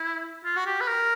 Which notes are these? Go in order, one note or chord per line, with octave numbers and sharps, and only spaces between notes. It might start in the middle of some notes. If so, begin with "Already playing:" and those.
Already playing: E4
F4
F#4
G4
B4
A#4